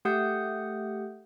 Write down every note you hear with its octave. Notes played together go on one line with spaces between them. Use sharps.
A3 G4 F#5 D#6 G6